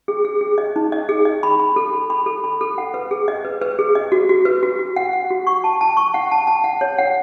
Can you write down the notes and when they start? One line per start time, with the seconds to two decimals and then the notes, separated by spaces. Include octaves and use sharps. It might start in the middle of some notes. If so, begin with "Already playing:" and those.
0.08 G#4
0.25 G#4
0.41 G#4
0.58 D#5
0.76 D#4
0.92 D#5
1.09 G#4
1.25 D#5
1.43 B5
1.60 B5
1.76 A4
1.93 B5
2.10 B5
2.26 A4
2.44 B5
2.61 A4
2.78 F#5
2.94 B4
3.11 G#4
3.28 D#5
3.45 B4
3.62 B4
3.79 G#4
3.95 D#5
4.12 F#4
4.29 F#4
4.45 B4
4.63 F#4
4.79 F#4
4.96 F#5
5.13 F#5
5.30 F#4
5.47 C#6
5.64 A5
5.81 A5
5.97 C#6
6.14 F#5
6.31 A5
6.47 A5
6.64 F#5
6.81 C#5
6.98 F#5